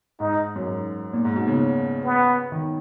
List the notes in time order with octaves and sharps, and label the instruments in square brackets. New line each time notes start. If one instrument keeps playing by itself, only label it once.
[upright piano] G#2 [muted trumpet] D#4
[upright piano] F#2
G#2
A#2
G#2
B2
C#3
[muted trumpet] B3
[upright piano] D#3